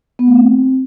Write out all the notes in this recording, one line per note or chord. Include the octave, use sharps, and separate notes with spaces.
B3
A3
C4